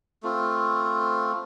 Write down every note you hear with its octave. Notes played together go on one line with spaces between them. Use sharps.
A3 C4 F4